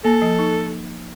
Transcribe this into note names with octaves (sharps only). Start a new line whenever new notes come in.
A#3 A4
F3
D#4